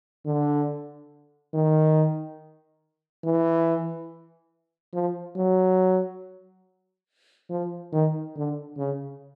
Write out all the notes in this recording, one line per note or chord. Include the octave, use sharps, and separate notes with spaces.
D3
D#3
E3
F3
F#3
F3
D#3
D3
C#3